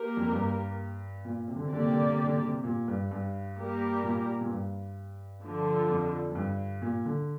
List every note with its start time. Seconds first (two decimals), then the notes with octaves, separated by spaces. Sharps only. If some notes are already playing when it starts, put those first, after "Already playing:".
Already playing: A#3 G4 A#4
0.17 F2
0.32 G2
1.25 A#2
1.48 C3
1.56 D3
1.65 C3
1.71 D3 A#3 G4 D5
1.82 C3
1.90 D3
1.98 C3
2.07 D3
2.16 C3
2.24 D3
2.32 C3
2.40 D3
2.48 C3
2.64 A#2
2.88 G2
3.11 G2
3.56 G3 A#3 G4 A#4
4.04 A#2
4.41 A#2
4.49 G2
5.42 D3 F3 D4
5.89 F2
6.32 F2
6.35 G2
6.82 A#2
7.05 D3